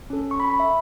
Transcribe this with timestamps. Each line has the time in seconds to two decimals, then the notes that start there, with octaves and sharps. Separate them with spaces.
0.10 C#4 A4
0.31 C#6
0.40 B5
0.50 B5
0.60 E5